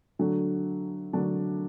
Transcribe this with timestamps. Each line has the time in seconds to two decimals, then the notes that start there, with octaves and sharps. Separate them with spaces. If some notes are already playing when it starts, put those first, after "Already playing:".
0.19 D3 F#3 A3 D4
1.13 D3 F#3 A3 D4